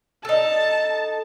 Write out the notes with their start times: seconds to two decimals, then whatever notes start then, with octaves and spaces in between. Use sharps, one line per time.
0.25 D#4 A4 A5